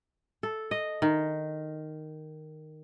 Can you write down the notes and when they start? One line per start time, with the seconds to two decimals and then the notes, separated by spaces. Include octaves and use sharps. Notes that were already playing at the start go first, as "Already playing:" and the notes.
0.43 A4
0.71 D#5
1.02 D#3